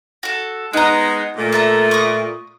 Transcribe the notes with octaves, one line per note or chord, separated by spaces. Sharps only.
F#4 A4
G#3 B3 D#4 F#5 A#5
A#2 A3
A4 E5 A#5
C#6 D#6